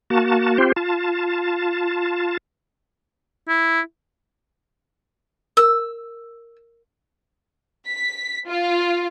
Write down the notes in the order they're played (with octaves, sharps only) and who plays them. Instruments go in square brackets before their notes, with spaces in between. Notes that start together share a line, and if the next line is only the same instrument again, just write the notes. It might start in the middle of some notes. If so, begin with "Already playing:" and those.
[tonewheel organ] A#3 F#4 A5
C4 F4 G4 C5
F4 A5
[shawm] E4
[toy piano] A#4 [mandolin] E6
[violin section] B6
F4